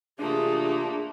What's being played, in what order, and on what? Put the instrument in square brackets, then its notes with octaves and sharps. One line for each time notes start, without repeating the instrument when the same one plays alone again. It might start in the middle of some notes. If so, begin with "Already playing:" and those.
[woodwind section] C3 E3 F4 [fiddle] A3 A#3 [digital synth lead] D4 [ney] G#4